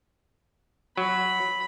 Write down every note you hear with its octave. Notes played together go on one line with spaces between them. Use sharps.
F#3 B5